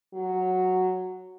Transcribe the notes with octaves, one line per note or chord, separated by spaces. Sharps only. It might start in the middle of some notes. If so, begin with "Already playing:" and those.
F#3